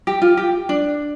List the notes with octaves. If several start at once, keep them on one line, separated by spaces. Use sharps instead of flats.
G4
F4
G4
D4